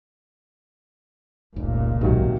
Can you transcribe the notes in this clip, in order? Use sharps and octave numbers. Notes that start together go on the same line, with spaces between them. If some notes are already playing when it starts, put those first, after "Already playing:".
F1 C#2 A#2
D#1 B1 G#2 C3 D#3 F#3